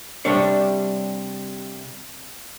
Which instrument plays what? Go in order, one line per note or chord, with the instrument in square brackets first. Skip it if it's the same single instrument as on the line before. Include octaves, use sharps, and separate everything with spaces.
[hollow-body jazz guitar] C3 G3 D4 C#5